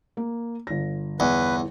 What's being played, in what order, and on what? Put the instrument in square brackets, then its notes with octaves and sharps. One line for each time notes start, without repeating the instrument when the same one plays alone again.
[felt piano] A#3
G1 A#6
[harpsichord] E2 [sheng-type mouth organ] B4